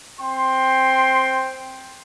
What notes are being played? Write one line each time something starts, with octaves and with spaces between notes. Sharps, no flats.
C4 G5 C6